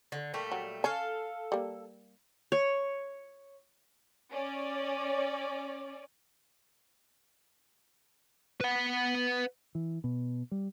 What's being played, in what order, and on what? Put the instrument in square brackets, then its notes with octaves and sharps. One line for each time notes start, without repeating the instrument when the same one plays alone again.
[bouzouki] D3
A#2 G3 A3
[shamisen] F#3
[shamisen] C#4 [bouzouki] A4 F5
[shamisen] G3 A#3
[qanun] C#5
[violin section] C#4 D5
[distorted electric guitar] B4 F#5
[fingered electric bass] E3
B2
G3